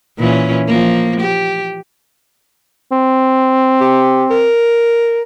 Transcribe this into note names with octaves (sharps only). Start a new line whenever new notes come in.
A#2 E3 C#4
F3 A#3
G4
C4
G4
A#4